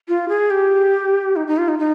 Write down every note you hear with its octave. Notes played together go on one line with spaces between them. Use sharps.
F4
G#4
G4
D#4
D#4
F4
D#4
D#4